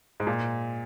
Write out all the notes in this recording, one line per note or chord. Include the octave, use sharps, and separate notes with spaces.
G#2
A#2